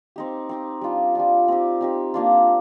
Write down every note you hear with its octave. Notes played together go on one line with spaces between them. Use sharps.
C4 D#4 G4
C4 D#4 G4
G3 D4 F4
G3 D4 F4
C4 D#4 G4
C4 D#4 G4
A#3 D4 F4